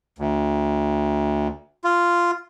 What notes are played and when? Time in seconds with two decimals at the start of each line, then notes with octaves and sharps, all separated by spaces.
0.18 D2
1.84 F4